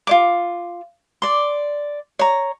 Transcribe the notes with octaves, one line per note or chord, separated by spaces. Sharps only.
F4 C#5 D6
D5 C6
C#5 A#5